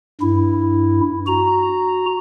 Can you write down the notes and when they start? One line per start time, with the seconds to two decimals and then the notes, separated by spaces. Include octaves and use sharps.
0.21 G2 E4
1.27 F#4 A#5